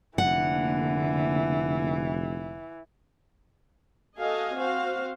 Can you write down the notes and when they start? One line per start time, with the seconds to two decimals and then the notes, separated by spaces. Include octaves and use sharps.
0.18 F1 D3 E3 A#3 F#5
4.20 F#4 A4 D#5 F5 G#5
4.55 C4 F#4 C5 F5